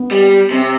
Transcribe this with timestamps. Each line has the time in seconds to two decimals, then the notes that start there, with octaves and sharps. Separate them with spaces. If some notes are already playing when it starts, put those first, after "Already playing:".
Already playing: B3
0.11 G3
0.51 C3 C4